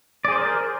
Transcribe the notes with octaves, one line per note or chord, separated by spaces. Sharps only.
G#4 A#4 C5 D5